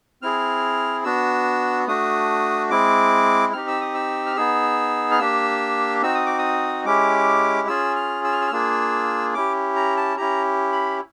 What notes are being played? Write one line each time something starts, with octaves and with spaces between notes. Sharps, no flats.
C4 E4 G#4 F6
B3 D4 F#4 E6
A3 D4 F#4 D#6
G#3 C4 E4 D6
C4 D#4 G4 F6
E6
D#6
E6
F6
B3 D#4 G#4 E6
F6
A#3 D4 G4 E6
C4 D#4 F#4 E6
D#6
D6
D#6
G#3 C#4 E4 G4 D6
C#4 F4 G#4 E6
F6
E6
F6
E6
F6
A#3 D4 F4 G#4 E6
C#4 E4 G4 D6
A#5
A5
C#4 E4 G4 A#5
B5